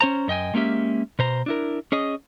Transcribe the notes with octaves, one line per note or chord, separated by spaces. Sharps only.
C#4 C5 A#5
F#2 D#5 G5 G#5
G#3 A#3 C#4 G4 E5
B2 C5 A#5
D4 E4 A#4
C#4 G#4 D#5